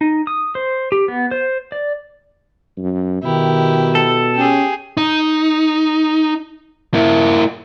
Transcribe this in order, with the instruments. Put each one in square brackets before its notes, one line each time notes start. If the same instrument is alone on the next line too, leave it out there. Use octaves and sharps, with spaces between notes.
[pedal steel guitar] D#4
D#6
C5
G4
B3
C5
D5
[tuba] F#2
[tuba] B2 [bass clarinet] D#3 [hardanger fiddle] E4 G4
[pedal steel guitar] A4
[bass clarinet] C#4 [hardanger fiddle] G4 G#4
[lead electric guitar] D#4
A#3 E4